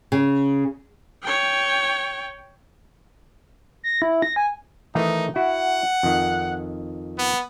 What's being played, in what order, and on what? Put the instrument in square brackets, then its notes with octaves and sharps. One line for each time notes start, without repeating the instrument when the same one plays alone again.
[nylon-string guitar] C#3
[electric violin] C#5 G5
[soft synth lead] A#6
E4
A#6
G#5
[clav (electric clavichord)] D#3 E3 A3 [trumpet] D#4
[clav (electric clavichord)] E4 F#4 [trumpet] F#5
[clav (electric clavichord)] F2 D#3
[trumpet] B3